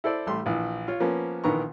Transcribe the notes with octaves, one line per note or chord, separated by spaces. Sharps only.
E4 A4 C5 D5
A1 G3 A3 G4 C6
A#1 E3
F4 C#5
F3 A#3 B3 C#4
A#1 D#3 E3 B3 A#5 C#6